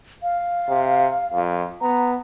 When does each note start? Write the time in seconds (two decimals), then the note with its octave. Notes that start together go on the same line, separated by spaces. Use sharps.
0.23 F5
0.69 C3
1.33 F2
1.81 B3 A#5